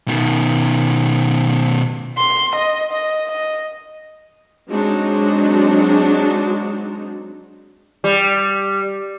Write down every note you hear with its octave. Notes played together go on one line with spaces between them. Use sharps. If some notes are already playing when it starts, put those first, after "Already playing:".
B2 D#3
C6
D#5
D#5
D#5
F#3 G#3 C4 D4 D#4 F#4
G3